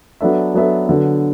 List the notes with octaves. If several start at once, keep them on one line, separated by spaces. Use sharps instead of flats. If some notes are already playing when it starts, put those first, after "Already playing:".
F#3 B3 D4 A4 E5
F#3 B3 D4 A4 E5
D3 F#3 B3